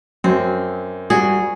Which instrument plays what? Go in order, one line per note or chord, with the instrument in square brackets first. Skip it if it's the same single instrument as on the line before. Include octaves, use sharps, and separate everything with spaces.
[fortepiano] F#2 [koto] C4
[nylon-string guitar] G3 F#4 [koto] G#4